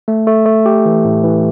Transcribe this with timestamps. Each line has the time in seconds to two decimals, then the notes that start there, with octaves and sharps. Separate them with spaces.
0.08 A3
0.27 A3
0.46 A3
0.66 G4
0.86 E3
1.04 A2
1.24 E3